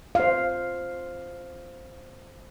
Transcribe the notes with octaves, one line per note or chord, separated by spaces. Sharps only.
C5 F5